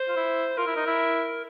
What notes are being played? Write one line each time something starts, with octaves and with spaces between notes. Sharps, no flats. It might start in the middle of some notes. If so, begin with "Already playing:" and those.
Already playing: C5
F4
E4
F4 A#4
E4
D#4
E4